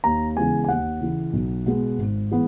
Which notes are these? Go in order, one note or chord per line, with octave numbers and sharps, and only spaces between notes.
D#2 A#5
C#3 E3 G#3 B3 G#5
G#5
D#2 F#5
C#3 E3
B1
B2 G#3 B3
G#1
E3 G#3 B3